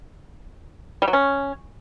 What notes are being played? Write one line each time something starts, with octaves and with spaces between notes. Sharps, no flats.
G3
F#3
C#4